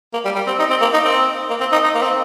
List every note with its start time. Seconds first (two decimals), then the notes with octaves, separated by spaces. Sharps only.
0.13 A#3
0.24 G3
0.35 G3
0.47 C4
0.59 D#4
0.70 C4
0.81 A#3
0.93 D#4
1.04 C4
1.50 A#3
1.60 C4
1.72 D#4
1.83 D#4
1.94 A#3
2.02 C4